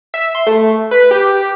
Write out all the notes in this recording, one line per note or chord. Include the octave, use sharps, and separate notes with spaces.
E5
C6
A3
B4
G4